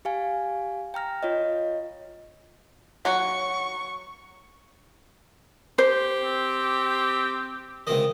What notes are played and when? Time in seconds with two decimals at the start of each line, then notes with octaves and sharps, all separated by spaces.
0.05 G4 F5 G#5
0.94 G5 A#5 F6 A#6
1.23 F4 C#5 D#5
3.05 F#3 F#4 C#6
5.78 G4 C5
6.21 C4
7.87 C#2 C3 D#3 D#5